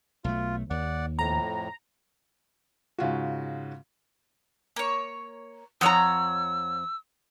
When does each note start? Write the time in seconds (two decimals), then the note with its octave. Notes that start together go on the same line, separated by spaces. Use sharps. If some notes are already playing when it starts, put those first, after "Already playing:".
0.24 B1 A3 F4
0.70 D#2 D5 F#5
1.19 F2 A2 A#5
2.98 G#2 C#3 F4 F#4
4.76 A#3 C#5
5.81 F2 C#5 F#5 A#5 D#6 E6